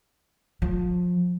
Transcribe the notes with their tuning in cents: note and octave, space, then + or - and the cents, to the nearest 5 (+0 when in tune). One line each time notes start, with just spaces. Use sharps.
F3 +25